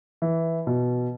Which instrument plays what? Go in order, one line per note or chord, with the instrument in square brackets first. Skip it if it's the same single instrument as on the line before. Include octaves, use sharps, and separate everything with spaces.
[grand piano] E3
B2